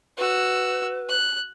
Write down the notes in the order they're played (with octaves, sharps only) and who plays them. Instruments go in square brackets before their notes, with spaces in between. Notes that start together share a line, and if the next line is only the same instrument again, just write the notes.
[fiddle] F#4 E6 [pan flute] B4
[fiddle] F#6